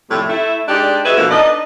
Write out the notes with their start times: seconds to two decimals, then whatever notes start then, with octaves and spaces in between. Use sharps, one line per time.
0.10 F2 A2 C3 G3 A3
0.29 A3 E4
0.68 G#3 D4 D#4 G4 D5
1.05 F#4 G#4 A4 B4 D#5 E5
1.17 B2 D3 E3 F3 A#3
1.30 D4 D#4 B4 D#5